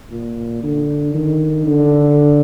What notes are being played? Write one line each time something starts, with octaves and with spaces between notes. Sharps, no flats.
A#2
D3
D#3
D3